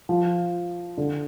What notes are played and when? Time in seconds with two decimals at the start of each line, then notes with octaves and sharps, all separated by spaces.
0.09 F3
0.97 D3